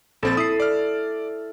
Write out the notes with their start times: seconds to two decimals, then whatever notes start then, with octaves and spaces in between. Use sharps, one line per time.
0.23 A#1 C4 A4 A6
0.37 E4 D#6 C7
0.60 D5 F6